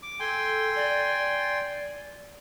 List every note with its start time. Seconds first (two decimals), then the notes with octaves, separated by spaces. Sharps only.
0.03 D6
0.20 A4 G5 G#5 C6
0.75 D5